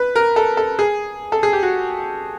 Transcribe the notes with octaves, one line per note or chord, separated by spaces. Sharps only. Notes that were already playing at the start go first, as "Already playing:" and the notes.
Already playing: B4
A#4
A4
A4
G#4
A4
G#4
G4
F#4